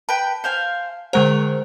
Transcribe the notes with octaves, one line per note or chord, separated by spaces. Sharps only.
B4 G5 A5 B5
C5 F5 G#5
D3 G#3 G#4 A#4 C5 F#5